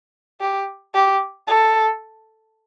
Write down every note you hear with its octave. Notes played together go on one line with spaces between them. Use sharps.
G4
G4
A4